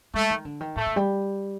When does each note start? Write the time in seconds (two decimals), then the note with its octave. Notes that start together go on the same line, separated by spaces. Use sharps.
0.14 G#3 A3
0.30 D#3
0.45 D3
0.61 D#3
0.76 A2 A3
0.86 D3
0.96 G3